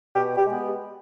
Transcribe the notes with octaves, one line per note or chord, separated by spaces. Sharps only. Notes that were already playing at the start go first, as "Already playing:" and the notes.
B2 G4
G4
G#3 B3